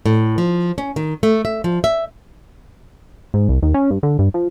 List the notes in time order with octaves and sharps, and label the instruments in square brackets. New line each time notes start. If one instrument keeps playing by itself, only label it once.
[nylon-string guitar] A2
F3
C#4
D#3
A3
E5
F3
E5
[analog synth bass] G#2
C2
D#2
C#4
G2
D3
G2
F3